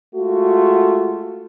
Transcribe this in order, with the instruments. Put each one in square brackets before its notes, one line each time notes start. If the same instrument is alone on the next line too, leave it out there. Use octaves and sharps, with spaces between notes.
[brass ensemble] G#3 A3 F4 F#4